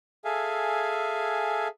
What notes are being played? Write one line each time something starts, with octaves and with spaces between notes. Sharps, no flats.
G#4 A4 E5 F5 G#5